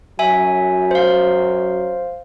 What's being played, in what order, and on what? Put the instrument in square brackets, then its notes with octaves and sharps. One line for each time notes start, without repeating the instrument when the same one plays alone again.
[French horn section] F#2 F#3 [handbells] E5 G#5
[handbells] C5 F5